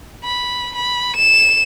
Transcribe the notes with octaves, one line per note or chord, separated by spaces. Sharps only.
B5
B5
E7